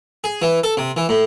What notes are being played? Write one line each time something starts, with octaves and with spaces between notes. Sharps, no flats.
G#4
E3
A4
C3
E3
A2